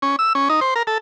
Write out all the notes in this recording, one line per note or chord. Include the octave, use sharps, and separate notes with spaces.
C#4
E6
C#4
D#4
C5
A#4
A4